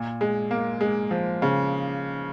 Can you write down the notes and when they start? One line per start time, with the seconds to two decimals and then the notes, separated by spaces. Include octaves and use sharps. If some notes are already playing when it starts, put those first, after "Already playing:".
Already playing: A#2
0.21 G#3
0.51 A#3
0.81 G#3
1.11 F3
1.42 C#3